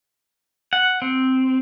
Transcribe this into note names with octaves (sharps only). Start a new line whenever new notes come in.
F#5
C4